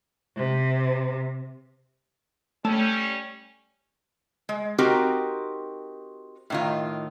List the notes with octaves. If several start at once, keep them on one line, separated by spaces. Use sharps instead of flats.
C3
G3 A3 C#4
G#3
C4 D#4 F#4 G4 A#4 C5
A2 D#3 F4